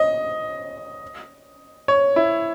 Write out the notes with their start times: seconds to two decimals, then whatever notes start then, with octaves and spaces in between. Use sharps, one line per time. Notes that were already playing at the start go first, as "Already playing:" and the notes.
Already playing: D#5
1.88 C#5
2.16 E4